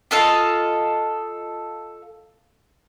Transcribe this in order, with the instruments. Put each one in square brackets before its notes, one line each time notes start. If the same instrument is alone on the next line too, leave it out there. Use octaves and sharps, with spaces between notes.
[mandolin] F4 A4 D#5 F5